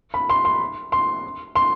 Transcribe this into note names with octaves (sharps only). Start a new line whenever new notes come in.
B5
C6
C6
C6
C6